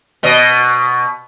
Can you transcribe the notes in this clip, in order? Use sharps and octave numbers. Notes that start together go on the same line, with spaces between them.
B2 D#5